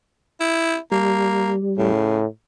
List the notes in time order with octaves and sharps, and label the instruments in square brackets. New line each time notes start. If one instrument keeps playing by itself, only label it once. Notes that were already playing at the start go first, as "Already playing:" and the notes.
[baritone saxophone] E4
[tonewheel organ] G3 [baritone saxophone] A#3
[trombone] A2 [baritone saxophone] C#3